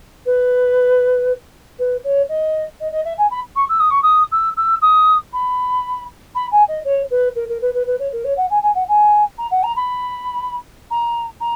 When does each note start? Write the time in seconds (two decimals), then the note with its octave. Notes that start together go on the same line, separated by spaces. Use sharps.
0.25 B4
1.79 B4
2.04 C#5
2.28 D#5
2.80 D#5
2.91 D#5
3.04 E5
3.17 G#5
3.30 B5
3.55 C#6
3.69 E6
3.79 D#6
3.90 C#6
4.02 D#6
4.31 E6
4.57 E6
4.81 D#6
5.33 B5
6.35 B5
6.51 G#5
6.68 D#5
6.84 C#5
7.10 B4
7.35 A#4
7.49 A#4
7.61 B4
7.74 B4
7.86 B4
7.99 C#5
8.12 A#4
8.24 C#5
8.37 F#5
8.50 G#5
8.62 G#5
8.74 F#5
8.88 G#5
9.38 A#5
9.51 F#5
9.63 A#5
9.76 B5
10.90 A#5
11.40 A#5